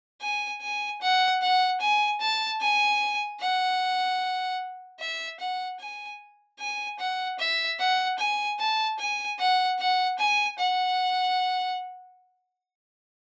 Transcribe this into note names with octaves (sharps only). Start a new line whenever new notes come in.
G#5
G#5
F#5
F#5
G#5
A5
G#5
F#5
E5
F#5
G#5
G#5
F#5
E5
F#5
G#5
A5
G#5
F#5
F#5
G#5
F#5